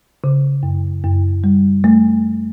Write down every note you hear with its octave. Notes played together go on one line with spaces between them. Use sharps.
C#3
F#2
F#2
G3
A3